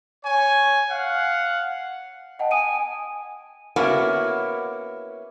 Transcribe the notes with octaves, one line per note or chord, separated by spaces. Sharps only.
C#5 G#5
F5 F#5
D#5 F#5 G5 A5
G#5 D#6 D7 D#7
A#3 B3 C#4 E4 F#4